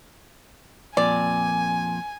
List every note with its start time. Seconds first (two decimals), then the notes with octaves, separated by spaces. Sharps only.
0.97 F2 A#2 D5 G#5